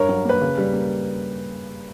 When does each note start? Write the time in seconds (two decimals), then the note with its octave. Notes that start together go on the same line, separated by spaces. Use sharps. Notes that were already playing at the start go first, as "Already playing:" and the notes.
Already playing: G2 A#4 C#5
0.09 F#3
0.25 A#3 B4
0.41 C#3
0.58 G3
0.73 A#3